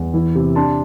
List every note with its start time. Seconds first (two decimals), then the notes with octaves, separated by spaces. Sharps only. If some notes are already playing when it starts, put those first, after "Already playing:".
Already playing: E2
0.14 E3
0.35 C3
0.55 D4 A5 C6